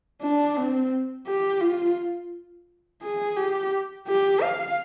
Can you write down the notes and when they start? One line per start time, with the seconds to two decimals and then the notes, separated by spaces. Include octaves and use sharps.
0.22 D4
0.57 C4
1.27 G4
1.61 F4
3.02 G#4
3.37 G4
4.07 G4
4.42 F5